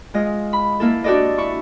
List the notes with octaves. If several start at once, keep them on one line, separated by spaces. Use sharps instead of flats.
G#3 F4 D#5
B5
A#3 E4 A4
D4 F#4 G4 A4 D5 D#5
E4 C#6